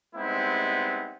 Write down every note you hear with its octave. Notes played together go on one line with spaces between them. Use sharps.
G3 G#3 B3 C4 D#4 E4